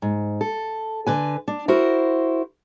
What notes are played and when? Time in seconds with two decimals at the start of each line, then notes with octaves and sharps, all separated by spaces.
0.02 G#2
0.41 A4
1.07 D3 B4 G#5
1.48 D4
1.68 E4 F#4 A#4 C5